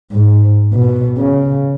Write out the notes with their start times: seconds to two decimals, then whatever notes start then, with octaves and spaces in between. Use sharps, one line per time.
0.12 G#2
0.74 B2
1.18 C#3